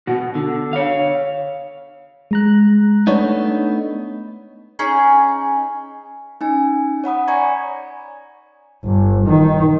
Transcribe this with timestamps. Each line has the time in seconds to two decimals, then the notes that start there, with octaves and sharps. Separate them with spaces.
0.07 B2 F#4
0.35 D3
0.73 C#5 F5
2.31 G#3 A#5 F#6
3.07 A3 B3 D4 D#4 C#5
4.79 C#4 D#4 G#4
6.41 C#4 D#4 G#5
7.04 C#5 F#5 B5 D#6
7.28 D5 G#5 A#5 B5 C#6 G#6
8.85 G1
9.26 D#3